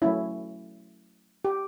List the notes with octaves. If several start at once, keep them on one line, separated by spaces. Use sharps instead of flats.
F#3 A3 C#4 E4
G4